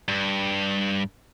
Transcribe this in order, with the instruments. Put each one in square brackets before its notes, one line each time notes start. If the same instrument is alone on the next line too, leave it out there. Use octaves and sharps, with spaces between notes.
[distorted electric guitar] G2